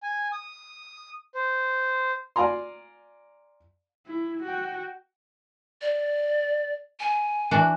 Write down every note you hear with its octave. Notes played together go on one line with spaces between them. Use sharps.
G#5
D#6
C5
D5 F5 G#5 A#5 C6
E4
F#4 G5
D5
G#5
E3 D4 F#4